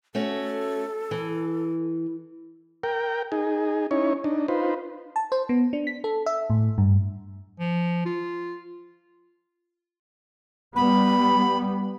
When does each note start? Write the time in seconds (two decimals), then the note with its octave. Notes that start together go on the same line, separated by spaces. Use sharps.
0.15 A3 C#4 F#4 A4
1.11 E3
2.83 A#4 G5
3.32 D#4 G#4
3.91 C#4 D#4 E4 C#5
4.24 D4 D#4
4.48 D#4 F4 B4 C5
5.16 A5
5.32 C5
5.49 B3
5.73 D4
5.87 B6
6.04 A4
6.26 E5
6.50 A2
6.78 G2
7.59 F3
8.05 F4
10.76 G3 B3 B5